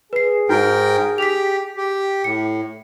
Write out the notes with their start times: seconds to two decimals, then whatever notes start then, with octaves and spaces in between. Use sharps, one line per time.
0.13 G#4 B4 C7
0.49 G#2 D#4 F#4 A#4 G5
1.18 G4 B6 F7
1.77 G4
2.24 A2 C#7